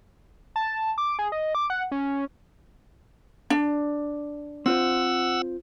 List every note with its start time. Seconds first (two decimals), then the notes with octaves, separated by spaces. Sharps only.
0.56 A5
0.98 D6
1.19 G#4
1.32 D#5
1.55 D6
1.70 F#5
1.92 C#4
3.50 D4
4.66 C4 F4 C5 F#5 E6